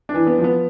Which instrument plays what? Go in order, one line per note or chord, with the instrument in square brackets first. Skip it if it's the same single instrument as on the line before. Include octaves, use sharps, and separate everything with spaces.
[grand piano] D4
[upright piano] E3
[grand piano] B3
[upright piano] F3
[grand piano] B3